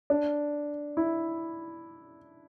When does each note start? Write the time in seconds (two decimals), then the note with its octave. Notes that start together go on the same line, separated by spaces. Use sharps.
0.10 D4
0.97 E4